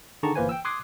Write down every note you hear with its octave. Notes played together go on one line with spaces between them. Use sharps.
D3 D#3 G#4 A5 A#5 C#6
G1 E3 A#3 B4 C5 G#5
G5 E6
C6 D6 D#6 F#6 G#6 C7